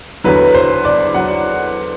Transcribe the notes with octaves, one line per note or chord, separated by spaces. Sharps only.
E2 D3 F#3 B4
C5
D5
F#3 F#5